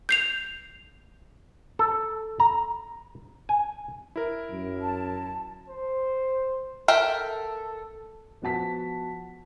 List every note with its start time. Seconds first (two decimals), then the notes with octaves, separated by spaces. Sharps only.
0.09 G6 C7 F7
1.79 A4
2.40 A#5
3.49 G#5
4.16 E4 A#4
4.51 F#2
4.80 A5
5.68 C5
6.88 A4 A#4 E5 G5
8.42 F3 B3 F#4 A5 B6